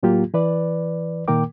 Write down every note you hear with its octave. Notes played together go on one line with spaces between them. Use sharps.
A2 F#3 A#3 F4 G4
E3 B4 D5
A#2 D#3 A#3 A#4 G5 D6